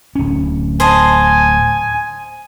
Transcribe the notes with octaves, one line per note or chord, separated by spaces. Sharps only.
D1 C#4
C5 D#5 G#5 A5